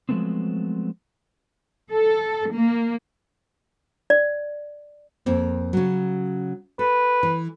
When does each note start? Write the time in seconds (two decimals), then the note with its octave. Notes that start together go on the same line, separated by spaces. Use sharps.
0.09 F3 F#3 G#3 A3 B3 C4
1.92 A4
2.53 A#3
4.10 D5
5.26 F2 A#3 C4
5.73 C#3 F#3
6.79 A4 B4
7.23 E3